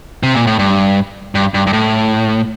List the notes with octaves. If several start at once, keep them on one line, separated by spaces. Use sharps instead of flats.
C3
A#2
A2
G2
G2
G2
G2
A2